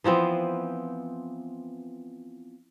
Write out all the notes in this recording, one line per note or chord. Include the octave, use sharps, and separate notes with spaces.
E3 F3 B3 C4